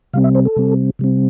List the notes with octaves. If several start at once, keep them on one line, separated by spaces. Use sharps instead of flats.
C3 G3 C4 F5
E5
C5
A4
C3 G3 C4
C3 G3 C4